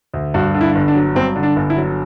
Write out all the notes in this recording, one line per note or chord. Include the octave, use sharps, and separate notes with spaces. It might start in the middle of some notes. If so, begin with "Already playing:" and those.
D2
G2 F#4
D3
E4
G1
D4
F#3
G2 C4
D3
D4
G1
E4
F#3